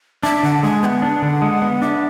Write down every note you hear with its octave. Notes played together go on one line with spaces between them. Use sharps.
D4 E5
D3 F#5
G#3 G#5
B3 F#5 G#5
D4
D3
G#3
B3
D4 E5